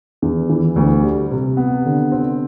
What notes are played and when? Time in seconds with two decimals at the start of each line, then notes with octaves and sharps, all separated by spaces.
0.22 E2
0.50 E3
0.76 D2
1.03 G3
1.31 C3
1.57 B3
1.85 D3
2.12 C4